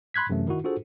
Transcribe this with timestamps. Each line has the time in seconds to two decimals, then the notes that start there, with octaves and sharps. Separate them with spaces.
0.14 B5 C6 F#6 G#6 B6
0.30 F#2 C3 E3 A3
0.48 D#3 E4 F#4
0.64 D4 F4 F#4 G#4 A4 C5